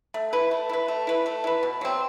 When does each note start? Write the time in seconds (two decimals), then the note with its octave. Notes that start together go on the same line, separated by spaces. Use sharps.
0.14 A3
0.33 E4 B4
0.51 A3
0.69 E4 B4
0.88 A3
1.07 E4 B4
1.26 A3
1.44 E4 B4
1.63 B2
1.81 F#3 C4